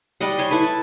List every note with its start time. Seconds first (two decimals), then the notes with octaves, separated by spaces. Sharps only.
0.20 G3 D5 D#5 F#5
0.38 C#5 G#5 C6
0.51 E4 A4 B4
0.63 A5